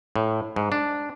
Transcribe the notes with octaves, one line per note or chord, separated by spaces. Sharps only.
A2
G#2
D4